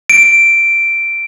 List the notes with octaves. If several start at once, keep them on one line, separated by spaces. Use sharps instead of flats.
D7